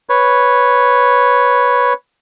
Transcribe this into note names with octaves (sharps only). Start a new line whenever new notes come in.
B4 C#5